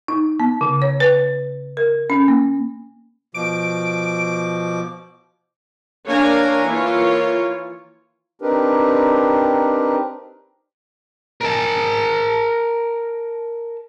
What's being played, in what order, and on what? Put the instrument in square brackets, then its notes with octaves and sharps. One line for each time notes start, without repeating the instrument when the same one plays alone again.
[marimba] D#4
B3
C#3
C#5
B4
A#4
C#4
A#3
[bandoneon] B2 F3 D6 [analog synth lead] D7
[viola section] A#3 D4 C#5 F5 G#5 A#5
E3 A#3 F4 C#5
[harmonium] C4 D4 D#4 G4 A#4 B4
[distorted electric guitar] A#4 A5